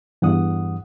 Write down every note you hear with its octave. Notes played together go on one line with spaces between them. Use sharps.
E2 G2 F#5 D#6